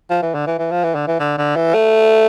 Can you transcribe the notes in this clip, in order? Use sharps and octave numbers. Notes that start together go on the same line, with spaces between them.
F3
E3
D3
E3
E3
F3
E3
D3
E3
D3
D3
E3
A3